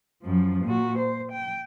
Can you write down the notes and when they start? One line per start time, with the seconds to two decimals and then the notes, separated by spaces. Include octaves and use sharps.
0.23 F#2 F3
0.65 A#2 F#4
0.98 C5
1.32 G5